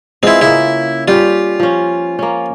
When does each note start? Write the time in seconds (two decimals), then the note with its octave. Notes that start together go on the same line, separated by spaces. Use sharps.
0.23 G#3 B3 C4 E4 F4
0.41 C#3 A#3 E4
1.08 G3 C#4 F4 G4
1.60 F3 C#4
2.19 A#3 C#4